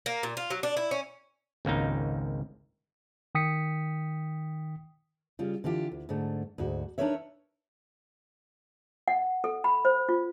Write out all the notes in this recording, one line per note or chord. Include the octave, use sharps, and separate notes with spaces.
A#3
A#2
F4
F#3
D4
E4
C#4
G#1 C#2 A#3 D#4
D#3 G5 D#6 B6 C#7
C#3 G3 F4
D3 E3 F4 G4
D2
G#2 D3 A3
D2 G#2 F#4
D4 D#4 A#4 B4 C#5 E5
F#5
A4
B5
C5
F4